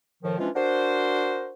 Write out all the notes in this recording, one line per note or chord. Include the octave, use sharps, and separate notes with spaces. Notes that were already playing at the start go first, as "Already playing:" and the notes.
A2 D#3 F3
E3 F3 G#3 C#4 D4 F4
D4 F#4 A#4 C5